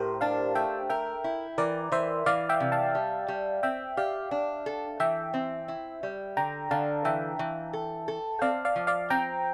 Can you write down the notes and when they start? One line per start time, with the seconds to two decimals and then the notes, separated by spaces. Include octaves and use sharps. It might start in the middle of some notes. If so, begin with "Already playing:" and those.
Already playing: A2 G4 A#4 C5
0.21 D4 F5 A5
0.55 A3 E5 G5
0.90 A#4 E5 G5
1.24 E4
1.58 E3 A#4 D5
1.92 E3 C5 E5
2.26 E3 D5 F5
2.49 E5 G5
2.60 C3
2.72 F5 A5
2.95 G3
3.28 G3
3.63 C4 E5 G5
3.97 G4 D5 F5
4.31 D4
4.66 A4
5.00 E3 E5 G5
5.34 C4
5.68 E4
6.03 G3
6.37 D3 G5 A#5
6.71 D3 F5 A5
7.05 E3 E5 G5
7.39 E3
7.73 A4
8.08 A4
8.42 C4 D5 F5
8.65 D5 F5
8.76 F3
8.87 D5 F5
9.10 C4 G5 A#5